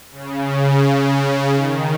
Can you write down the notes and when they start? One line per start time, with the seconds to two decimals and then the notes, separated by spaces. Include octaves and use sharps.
0.12 C#3
1.54 D#3